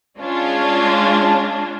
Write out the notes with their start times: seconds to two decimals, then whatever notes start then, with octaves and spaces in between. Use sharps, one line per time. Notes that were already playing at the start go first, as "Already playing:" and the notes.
0.20 G#3 C#4 D4 F4